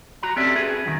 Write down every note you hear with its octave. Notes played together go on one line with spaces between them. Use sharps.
F#4 A#5
C4 C#4 G4 A4 D5 E5
F#4 G#4 B4
F#2 D#3